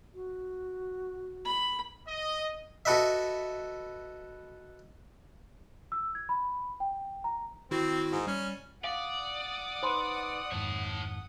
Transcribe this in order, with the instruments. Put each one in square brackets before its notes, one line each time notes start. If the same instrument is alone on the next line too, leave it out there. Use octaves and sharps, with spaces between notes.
[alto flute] F#4
[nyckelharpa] B5
[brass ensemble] D#5
[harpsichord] F#4 A4 B4 D#5 E5
[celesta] E6
G#6
B5
G5
A#5
[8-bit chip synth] D#3 E4 F#4 [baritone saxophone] C4
[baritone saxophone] G#2
[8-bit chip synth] G3 [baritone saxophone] C#4
[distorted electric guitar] D5 [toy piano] F5 [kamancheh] F#5 D#6
[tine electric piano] D#4 B4 [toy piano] C5 B5 C6
[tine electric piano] F2 G#2 D#3 [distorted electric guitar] C#5 A5